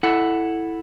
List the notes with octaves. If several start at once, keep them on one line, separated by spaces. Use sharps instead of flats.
E4 A4 F#5